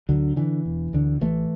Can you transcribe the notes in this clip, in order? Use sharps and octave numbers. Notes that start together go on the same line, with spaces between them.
D2 D3 F#3
D3 E3
E1
D2 D3
A1 E3 A3